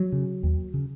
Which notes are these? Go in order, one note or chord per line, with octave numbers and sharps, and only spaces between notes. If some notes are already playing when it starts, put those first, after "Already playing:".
Already playing: F#3
C#3
D#2
C#3